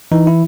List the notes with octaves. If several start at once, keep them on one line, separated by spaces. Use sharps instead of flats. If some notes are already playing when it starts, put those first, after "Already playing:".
E3 D#4
E4